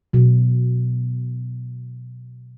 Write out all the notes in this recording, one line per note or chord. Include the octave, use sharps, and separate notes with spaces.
B2 F#3